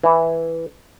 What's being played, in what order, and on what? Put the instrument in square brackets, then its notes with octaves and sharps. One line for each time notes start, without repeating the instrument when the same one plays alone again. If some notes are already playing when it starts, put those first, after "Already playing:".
[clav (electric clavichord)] E3 E4